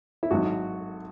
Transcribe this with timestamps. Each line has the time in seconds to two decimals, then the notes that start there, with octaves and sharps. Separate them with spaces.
0.23 E4
0.31 G#1 F#3 F#4